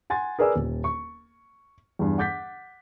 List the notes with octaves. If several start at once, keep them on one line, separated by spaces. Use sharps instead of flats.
F#5 G#5 C6 A6
G#4 A#4 B4 D5 G#5 E6
D#1
C#6
E2 G2
F#5 D6 G6 A6 B6